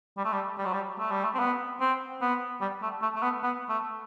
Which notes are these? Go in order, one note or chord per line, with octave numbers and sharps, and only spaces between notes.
G3
A3
G3
G3
F#3
G3
A3
G3
A3
C4
B3
C4
B3
G3
A3
A3
A3
B3
B3
A3